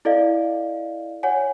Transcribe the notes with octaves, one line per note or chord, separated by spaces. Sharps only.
E4 A4 D5 D#5 F5
C#5 F#5 G#5